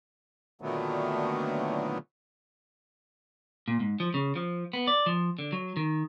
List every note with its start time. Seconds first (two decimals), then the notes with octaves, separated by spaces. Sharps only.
0.61 A#2 D3 D#3 F#3 A3 B3
3.68 A#2
3.80 G#2
4.00 F3
4.14 C#3
4.36 F3
4.73 B3
4.88 D5
5.06 F3
5.39 D3
5.52 F#3
5.77 D#3